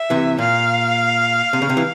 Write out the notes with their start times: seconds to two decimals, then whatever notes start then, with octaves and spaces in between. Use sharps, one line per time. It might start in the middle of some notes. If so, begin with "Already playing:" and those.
Already playing: E5
0.10 C3 E3
0.38 A#2 F5
1.53 C3
1.62 C#3
1.69 C3
1.77 E3